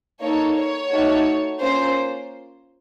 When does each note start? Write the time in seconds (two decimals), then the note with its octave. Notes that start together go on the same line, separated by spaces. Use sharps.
0.20 A#3 D#4 A4 C#5
0.55 C#5
0.90 A3 D#4 F#4 A4
1.59 A#3 C#4 F4 C5